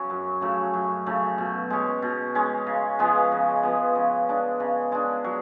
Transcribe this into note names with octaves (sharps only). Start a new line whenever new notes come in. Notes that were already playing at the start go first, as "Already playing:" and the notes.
Already playing: C#3 F#3 C#4
F#2
C#3 F#3 A3
F#2
C#3 F#3 A3
B2
G#3 C#4
B2
G#3 C#4
C#3
F3 G#3 B3
C#3
F3 G#3 B3
C#3
G#3 D4
C#3
G#3 D4
F#3